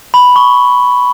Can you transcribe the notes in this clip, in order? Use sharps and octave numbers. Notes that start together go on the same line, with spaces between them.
B5
C#6